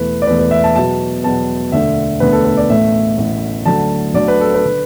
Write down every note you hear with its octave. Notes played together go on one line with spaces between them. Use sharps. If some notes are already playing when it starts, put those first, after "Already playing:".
Already playing: E1 E2 E3 A3 B4
D5
E1 E2 E3 A3 B4
B4
E5
A5
E2 B2 F#3 B3 A5
E2 B2 F#3 B3 A5
E1 D2 D3 A3 E5
E1 D2 D3 A3 B4
A4
B4
D5
A1 A2 A3 E5
A1 A2 A3
D2 D3 F#3 A3 A5
D2 D3 F#3 A3 D5
B4
A4
B4
D3